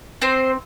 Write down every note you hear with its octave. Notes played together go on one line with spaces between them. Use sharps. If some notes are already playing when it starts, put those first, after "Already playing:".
C4 C5